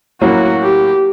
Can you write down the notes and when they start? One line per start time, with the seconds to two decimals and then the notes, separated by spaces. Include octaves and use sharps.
0.21 A2 F#3 A#3 C#4 F#4
0.62 G4